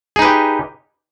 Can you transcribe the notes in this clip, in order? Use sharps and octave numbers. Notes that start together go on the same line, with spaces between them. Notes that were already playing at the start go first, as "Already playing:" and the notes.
D#4 G4 G#4 B4